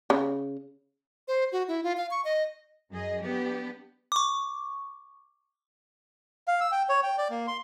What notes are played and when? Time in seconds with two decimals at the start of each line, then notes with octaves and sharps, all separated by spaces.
0.10 C#3
1.28 C5
1.52 F#4
1.68 E4
1.84 F4
1.97 F5
2.11 C#6
2.25 D#5
2.91 F#2 G#4 D#5
3.23 F#3 B3 D4 G4
4.12 C#6 D6
6.48 F5
6.61 E6
6.72 G5
6.89 C#5
7.03 G5
7.18 D5
7.30 A#3
7.48 C6